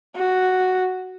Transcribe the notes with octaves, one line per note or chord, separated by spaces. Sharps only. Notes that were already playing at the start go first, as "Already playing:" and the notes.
F#4